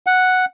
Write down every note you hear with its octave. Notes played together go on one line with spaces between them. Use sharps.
F#5